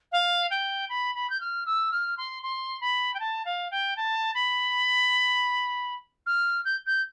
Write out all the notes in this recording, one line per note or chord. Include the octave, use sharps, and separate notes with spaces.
F5
G5
B5
B5
G6
F6
E6
F6
C6
C6
B5
G5
A5
F5
G5
A5
B5
F6
G6
G6